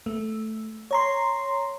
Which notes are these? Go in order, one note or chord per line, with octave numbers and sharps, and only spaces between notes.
A3
C#5 A#5 C6